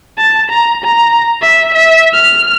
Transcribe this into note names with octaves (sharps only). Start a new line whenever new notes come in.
A5
A#5
A#5
E5
E5
F6